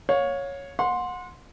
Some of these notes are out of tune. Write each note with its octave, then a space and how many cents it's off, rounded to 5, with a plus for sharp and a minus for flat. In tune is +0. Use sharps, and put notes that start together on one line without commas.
C#5 +0 F5 +30
F#5 -30 C6 +0